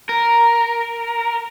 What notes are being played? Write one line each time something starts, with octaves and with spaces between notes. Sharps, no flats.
A#4